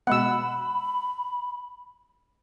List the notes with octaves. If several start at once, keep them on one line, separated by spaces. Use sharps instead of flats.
B2 G#3 B3 F#5 B5 E6